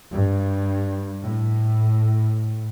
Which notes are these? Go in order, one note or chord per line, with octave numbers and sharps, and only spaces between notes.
G2
A2